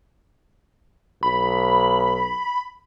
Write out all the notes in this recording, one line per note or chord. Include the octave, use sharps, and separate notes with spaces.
B1 B5